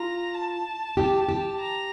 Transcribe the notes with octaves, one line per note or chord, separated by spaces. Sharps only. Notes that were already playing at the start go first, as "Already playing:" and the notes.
Already playing: F4 A#5
A5
G4
G4
A#5